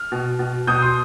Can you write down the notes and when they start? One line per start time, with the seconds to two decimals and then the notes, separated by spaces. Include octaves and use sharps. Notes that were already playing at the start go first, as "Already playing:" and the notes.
Already playing: F6
0.12 B2
0.39 B2
0.67 B2 D#6 G6
0.82 C6 D#6